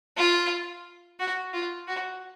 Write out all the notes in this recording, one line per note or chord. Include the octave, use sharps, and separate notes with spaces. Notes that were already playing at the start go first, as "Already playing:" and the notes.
F4
F#4
F4
F#4